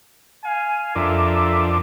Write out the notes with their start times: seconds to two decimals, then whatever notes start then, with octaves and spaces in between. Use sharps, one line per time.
0.44 F5 G#5
0.96 F2 D4 A4 A#4 E5